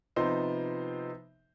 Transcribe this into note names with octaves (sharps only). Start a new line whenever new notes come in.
C3 F3 B3 D#4 C5